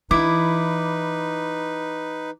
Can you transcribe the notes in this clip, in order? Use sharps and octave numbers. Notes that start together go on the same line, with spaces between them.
E3 D#4 E4 B4 D6